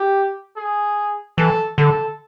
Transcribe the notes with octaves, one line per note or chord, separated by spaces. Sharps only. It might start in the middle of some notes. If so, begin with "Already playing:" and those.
Already playing: G4
G#4
E3 A4
D3 A4